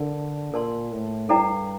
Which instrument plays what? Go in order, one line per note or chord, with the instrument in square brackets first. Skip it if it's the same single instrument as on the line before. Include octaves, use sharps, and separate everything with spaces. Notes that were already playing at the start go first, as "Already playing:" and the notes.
Already playing: [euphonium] D3 [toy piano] A#4
[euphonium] A#2 [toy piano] A#4 D5 A5 C6
[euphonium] A2
[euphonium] G2 [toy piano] E4 A4 D5 G5 A#5